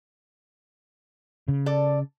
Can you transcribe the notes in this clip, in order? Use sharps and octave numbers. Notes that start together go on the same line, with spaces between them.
C#3
A4 D5